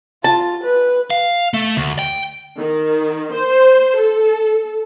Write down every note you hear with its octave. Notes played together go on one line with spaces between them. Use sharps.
F4 A5
B4
F5
A3
D2
G5
D#3
C5
A4